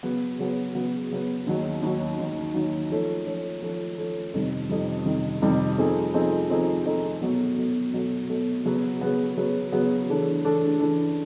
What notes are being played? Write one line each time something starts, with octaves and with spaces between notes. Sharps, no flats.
C#3 F#3 B3
C#3 F#3 B3
C#3 F#3 B3
C#3 F#3 B3
D#2 D#3 F#3
D#2 D#3 F#3
D#2 D#3 F#3
D#2 D#3 F#3
F3 A3 C#4
F3 A3 C#4
F3 A3 C#4
F3 A3 C#4
F2 C3 D#3 G3
F2 C3 D#3 G3
F2 C3 D#3 G3
F2 C3 D#3 G3
F3 A3 C4 D#4 G#4
F3 A3 C4 D#4 G#4
F3 A3 C4 D#4 G#4
F3 A3 C4 D#4 G#4
B2 F#3 A3
B2 F#3 A3
B2 F#3 A3
B2 F#3 A3
C#3 F#3 B3
C#3 F#3 B3
C#3 F#3 B3
C#3 F#3 B3
C#3 E3 A3 D4
C#3 E3 A3 D4
C#3 E3 A3 D4